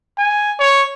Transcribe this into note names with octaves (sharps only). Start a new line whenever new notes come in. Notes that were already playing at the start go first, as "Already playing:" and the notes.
G#5
C#5